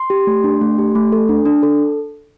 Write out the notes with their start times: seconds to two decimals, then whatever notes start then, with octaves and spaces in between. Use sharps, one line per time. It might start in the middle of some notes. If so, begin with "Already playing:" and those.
Already playing: C6
0.10 G4
0.27 A3
0.44 D4
0.61 A3
0.78 G4
0.95 A3
1.12 A4
1.29 D4
1.46 D4
1.63 A4